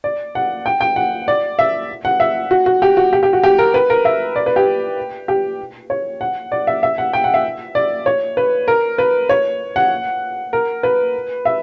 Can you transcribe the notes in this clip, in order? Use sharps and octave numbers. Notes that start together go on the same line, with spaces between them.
D5
F#5
G5
G5
F#5
D5
E5
F#5
E5
F#4
F#4
G4
F#4
G4
G4
F#4
G4
A#4
B4
A#4
E5
D5
B4
G4
G4
C#5
F#5
D5
E5
E5
F#5
G5
F#5
E5
D5
C#5
B4
A#4
B4
C#5
F#5
A#4
B4
E5